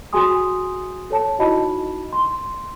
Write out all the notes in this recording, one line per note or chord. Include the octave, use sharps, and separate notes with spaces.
F#4 G#4 G#5 C6 D#6
A4 C#5 A5
D#4 E4 F#4 D#5 A5 B5
C6